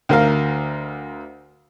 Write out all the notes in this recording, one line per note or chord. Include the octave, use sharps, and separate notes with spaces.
D2 A#4 F5